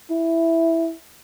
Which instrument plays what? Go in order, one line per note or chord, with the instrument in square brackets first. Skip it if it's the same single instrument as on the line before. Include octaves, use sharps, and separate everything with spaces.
[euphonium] E4